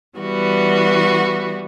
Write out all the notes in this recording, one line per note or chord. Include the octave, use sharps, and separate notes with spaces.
E3 G3 B3 F#4